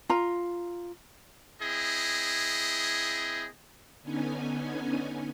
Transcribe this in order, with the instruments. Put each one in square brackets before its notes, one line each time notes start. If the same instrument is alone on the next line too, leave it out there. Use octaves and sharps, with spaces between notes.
[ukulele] F4 A#5
[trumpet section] C4 E4 G#4 D#5
[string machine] D3 B3 C#4 D#4 G#5